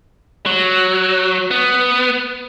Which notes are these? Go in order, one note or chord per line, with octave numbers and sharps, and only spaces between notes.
F#3
B3